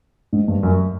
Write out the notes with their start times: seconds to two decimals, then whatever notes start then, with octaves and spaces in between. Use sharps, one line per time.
0.33 G#2
0.48 G2
0.63 F#2